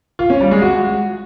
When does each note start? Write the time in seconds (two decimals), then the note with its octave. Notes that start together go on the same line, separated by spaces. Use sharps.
0.19 F4
0.30 C#4
0.41 G3
0.51 G#3
0.62 F#4